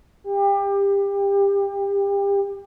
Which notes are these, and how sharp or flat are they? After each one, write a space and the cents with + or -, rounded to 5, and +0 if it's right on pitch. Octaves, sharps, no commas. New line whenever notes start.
G4 +25